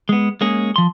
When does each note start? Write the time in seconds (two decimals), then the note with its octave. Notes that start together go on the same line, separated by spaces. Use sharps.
0.09 G#3 B3
0.41 G#3 A#3 C#4 G#4
0.76 F3 C6